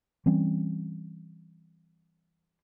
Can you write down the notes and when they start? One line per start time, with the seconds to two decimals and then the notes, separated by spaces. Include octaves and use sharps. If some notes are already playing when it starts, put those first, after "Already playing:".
0.26 E3 G3 C4 C#4